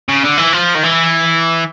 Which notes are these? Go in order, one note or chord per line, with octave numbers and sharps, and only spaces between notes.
C#3
D3
E3
F3
D#3
E3